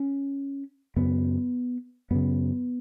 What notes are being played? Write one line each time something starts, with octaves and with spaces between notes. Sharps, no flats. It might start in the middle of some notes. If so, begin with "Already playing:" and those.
Already playing: C#4
F#2 C#3 B3
F#2 C#3 B3